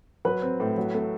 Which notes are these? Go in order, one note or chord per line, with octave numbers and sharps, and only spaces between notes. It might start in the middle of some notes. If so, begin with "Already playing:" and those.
F#3 B4 B5
C4
A2
F#3
A3